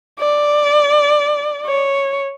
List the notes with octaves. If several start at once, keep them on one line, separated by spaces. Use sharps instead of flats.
D5
C#5